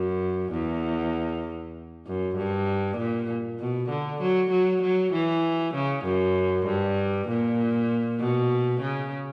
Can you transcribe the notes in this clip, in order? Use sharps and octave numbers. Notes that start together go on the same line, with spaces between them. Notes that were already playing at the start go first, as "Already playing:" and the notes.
Already playing: F#2
E2
F#2
G2
A#2
B2
D3
F#3
F#3
F#3
E3
C#3
F#2
G2
A#2
B2
C#3